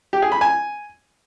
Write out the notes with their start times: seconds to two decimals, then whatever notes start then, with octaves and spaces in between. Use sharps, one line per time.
0.13 G4
0.22 G#4
0.32 B5
0.41 G#5